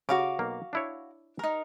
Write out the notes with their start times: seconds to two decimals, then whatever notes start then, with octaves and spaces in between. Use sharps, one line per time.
0.09 C#3 F#4 F5 D6
0.39 B1 A#3
0.73 D4 E4 C#5
1.39 D#4 A#4